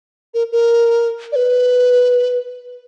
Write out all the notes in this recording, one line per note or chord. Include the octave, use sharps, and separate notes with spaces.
A#4
A#4
D5
B4